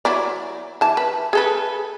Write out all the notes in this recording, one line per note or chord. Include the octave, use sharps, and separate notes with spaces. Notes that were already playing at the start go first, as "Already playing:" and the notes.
F#3 E4 D5
E3 A5
B4
G#4 A4 B4